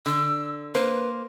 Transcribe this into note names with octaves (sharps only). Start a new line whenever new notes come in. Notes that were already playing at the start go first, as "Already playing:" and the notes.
D3 E6
A#3 B4 C5